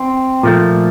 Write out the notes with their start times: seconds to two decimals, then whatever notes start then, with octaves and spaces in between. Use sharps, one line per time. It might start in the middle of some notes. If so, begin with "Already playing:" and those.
Already playing: C4
0.43 A#2 F3 A3